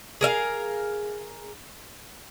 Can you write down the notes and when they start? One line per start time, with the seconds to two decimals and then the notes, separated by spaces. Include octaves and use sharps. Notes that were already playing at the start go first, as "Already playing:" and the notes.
0.21 G#4 A#4 E5 F5